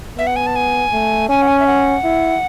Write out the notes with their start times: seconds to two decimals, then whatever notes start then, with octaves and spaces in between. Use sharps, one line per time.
0.18 B3 E5
0.27 F#5
0.36 G#5
0.47 A5
0.56 G#5
0.93 A3
1.29 C#4 G#5
1.42 F#5
1.48 G#5
1.60 E5
1.67 F#5
2.04 E4